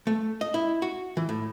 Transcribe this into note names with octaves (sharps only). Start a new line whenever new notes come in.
A3
D#5
E4
F#4
E3
A2